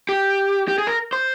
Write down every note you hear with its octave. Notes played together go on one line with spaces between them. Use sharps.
G4
G4
G#4
A#4
C5